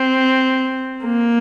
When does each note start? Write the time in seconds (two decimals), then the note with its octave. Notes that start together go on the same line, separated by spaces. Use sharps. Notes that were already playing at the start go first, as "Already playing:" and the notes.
Already playing: C4
1.05 A#3